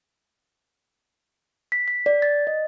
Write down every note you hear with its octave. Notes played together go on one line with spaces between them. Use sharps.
B6
B6
D5
A6
D#5